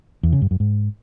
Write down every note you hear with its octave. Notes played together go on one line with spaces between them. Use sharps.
E2
C#3
G2
F#2
G#2